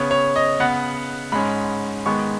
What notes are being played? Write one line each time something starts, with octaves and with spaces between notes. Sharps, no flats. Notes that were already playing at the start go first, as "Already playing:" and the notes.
Already playing: C#3 B3 C#5
C#5
D#5
C#3 B3 F#5
G#2 G#3 C#4 B5
G#2 D#3 G#3 B3 C#6